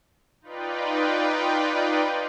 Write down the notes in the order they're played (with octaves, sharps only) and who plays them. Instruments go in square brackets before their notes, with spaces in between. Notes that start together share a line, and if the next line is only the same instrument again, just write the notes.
[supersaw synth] D#4 F4 B4 D5 G5